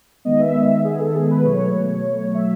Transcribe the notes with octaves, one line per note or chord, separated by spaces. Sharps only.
D#3 G#3 B3 D#5
E5
G#4
A4
G#4
B4
B2 F#3 A3 C#5
E5